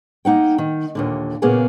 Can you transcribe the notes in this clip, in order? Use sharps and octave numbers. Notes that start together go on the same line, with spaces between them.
A#3 D#4 F#5 G5
D#3
D#2 A#2 D3
A#2 C#3 A#3 B3 G#4 G#5